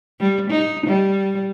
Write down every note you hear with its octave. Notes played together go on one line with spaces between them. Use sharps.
G3
D#4
G3